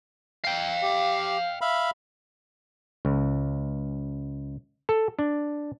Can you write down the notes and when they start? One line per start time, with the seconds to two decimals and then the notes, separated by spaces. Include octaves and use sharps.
0.45 F5 G5
0.83 G4
1.61 E5 F5 B5
3.05 C#2
4.89 A4
5.19 D4